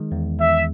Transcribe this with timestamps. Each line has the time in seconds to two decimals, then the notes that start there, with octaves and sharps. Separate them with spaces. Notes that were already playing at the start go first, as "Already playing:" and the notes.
Already playing: D#3 G#3
0.12 E2
0.39 E2 E5